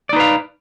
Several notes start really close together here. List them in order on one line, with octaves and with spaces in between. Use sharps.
D5 D#4 B4 F5